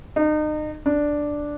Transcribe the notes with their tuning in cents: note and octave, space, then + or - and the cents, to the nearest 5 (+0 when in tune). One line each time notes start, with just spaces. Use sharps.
D#4 -35
D4 +0